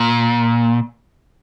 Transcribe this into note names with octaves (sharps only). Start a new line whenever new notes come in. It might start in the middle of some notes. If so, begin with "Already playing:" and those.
Already playing: A#2